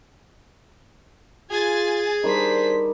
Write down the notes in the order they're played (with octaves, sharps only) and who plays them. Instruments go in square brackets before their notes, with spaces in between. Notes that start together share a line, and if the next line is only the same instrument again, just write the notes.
[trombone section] F4 [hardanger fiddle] G#4 [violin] G#5 A6
[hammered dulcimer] D#3 G3 D#4 [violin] D4 B6 [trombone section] C5